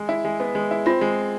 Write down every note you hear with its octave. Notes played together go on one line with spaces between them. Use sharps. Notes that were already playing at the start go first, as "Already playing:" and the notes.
Already playing: G#3
E4
G#3
B3
G#3
E4
C4 F4
G#3